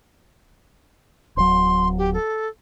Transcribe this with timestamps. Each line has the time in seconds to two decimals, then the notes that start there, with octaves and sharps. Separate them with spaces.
1.37 D1 F#3 C6
1.98 G4
2.14 A4